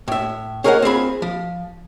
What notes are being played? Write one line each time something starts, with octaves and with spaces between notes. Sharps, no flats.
A2 E5
C#4 G#4 A#4 C#5 D#5 F#5
C4 F4 G#4 B5
F3